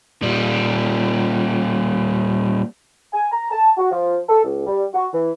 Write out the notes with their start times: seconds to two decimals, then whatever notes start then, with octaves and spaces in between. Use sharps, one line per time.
0.22 A#2 G3
3.13 G#5
3.32 A#5
3.51 A5
3.77 F#4
3.92 F3
4.29 A4
4.43 C#2
4.67 G3
4.94 F#4
5.14 E3